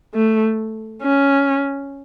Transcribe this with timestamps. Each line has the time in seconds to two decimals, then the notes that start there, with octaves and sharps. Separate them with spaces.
0.14 A3
1.03 C#4